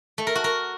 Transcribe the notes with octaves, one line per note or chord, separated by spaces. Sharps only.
A3
A#4
F#4
A#4